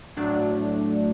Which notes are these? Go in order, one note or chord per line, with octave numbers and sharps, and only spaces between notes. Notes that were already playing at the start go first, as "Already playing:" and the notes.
A2 F#3 A3 D4